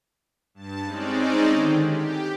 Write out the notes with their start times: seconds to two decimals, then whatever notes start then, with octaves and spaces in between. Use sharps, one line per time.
0.54 G2 A5
0.84 G#3 C4 C#4 D#4 D5
1.50 D3 D#3
1.83 G4